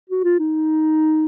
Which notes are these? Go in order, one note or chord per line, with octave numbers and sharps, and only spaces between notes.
F#4
F4
D#4